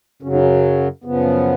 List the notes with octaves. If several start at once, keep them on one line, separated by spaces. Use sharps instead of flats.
F#2 C#3 F#3 C#4
D#4
C#4
F#2 C#3 F3 B3